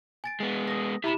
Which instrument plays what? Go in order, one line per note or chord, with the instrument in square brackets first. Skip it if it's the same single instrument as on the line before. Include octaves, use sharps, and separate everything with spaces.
[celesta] G#5 A6 D7
[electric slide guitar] G#3 B3
[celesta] D#6 A#6
[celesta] E4 B5 E7 [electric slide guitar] G4 E5